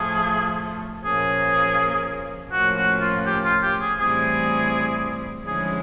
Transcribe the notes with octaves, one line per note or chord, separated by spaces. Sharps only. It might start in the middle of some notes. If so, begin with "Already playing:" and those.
Already playing: A2 F3 A3 G#4
A#2 F3 A#3 C#4 G#4
A2 F3 A#3 C#4 F#4
F#4
F4
G4
F4
G4
G#4
A2 E3 G3 C4 E4 G#4
D3 F3 G#3 C#4 E4 G#4